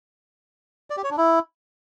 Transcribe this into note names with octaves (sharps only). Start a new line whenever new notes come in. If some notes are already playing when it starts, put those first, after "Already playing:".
D5
G4
C#5
D4
E4